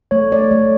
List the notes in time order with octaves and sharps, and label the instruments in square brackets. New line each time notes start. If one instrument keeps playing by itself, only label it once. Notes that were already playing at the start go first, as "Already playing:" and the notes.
[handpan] A3 [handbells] C#5
[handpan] D5
A3